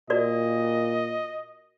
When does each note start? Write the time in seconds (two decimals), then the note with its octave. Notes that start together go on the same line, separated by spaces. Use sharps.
0.10 A#2 F#4 A#4 D5 D#5